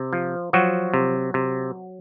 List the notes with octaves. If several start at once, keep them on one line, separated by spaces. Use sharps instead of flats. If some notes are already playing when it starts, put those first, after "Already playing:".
Already playing: C3
F3
F3 F#3 F#4
C3
C3